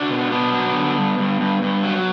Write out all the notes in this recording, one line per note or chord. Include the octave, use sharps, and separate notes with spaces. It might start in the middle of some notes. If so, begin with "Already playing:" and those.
Already playing: D4 F#4
B2
B2 B3 D4
F#3
D3
G2
G2
G2
G2
F#3